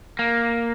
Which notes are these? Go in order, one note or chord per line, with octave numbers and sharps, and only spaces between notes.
A#3